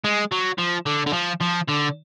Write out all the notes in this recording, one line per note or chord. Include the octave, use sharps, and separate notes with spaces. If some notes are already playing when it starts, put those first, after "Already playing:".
G#3
F#3
F3
D3
D3
F3
F3
D3